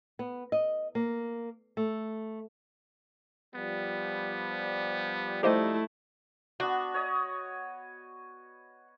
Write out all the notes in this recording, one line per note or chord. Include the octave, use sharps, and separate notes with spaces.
B3
D#5
A#3
A3
F3 G3 B3
A3 D#4 E4 G4 C5 D#5
B3 D4 F#4
C#5 D#5